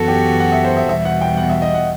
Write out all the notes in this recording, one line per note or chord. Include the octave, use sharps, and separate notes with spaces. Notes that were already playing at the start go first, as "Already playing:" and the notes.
Already playing: F#2 E3 B3 F#4 A4
G4
F#5
E5
C5
E5
E2 B2 G3 E5
F#5
G5
F#5
E5
D#5
F#5